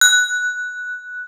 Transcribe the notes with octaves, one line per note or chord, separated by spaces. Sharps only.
F#6